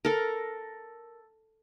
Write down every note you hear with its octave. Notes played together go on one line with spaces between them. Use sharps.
A4 A#4